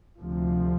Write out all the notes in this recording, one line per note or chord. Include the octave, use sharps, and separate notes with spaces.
D2 C3 F3